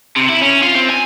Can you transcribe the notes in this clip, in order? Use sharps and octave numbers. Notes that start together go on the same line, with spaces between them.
C3
E4
C#4
F4
C4
G#5